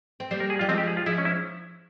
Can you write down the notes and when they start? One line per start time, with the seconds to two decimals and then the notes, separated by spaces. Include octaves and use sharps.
0.20 C4
0.31 G3 A#3 C5
0.40 A#4
0.50 G#4
0.59 G3 F4
0.69 F3 G#3 C4
0.78 G4
0.88 G#4
0.97 F4
1.06 F3 G#3 E4
1.18 C#4
1.25 E4